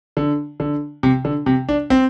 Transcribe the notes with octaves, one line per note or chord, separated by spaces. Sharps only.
D3
D3
C3
D3
C3
D4
C4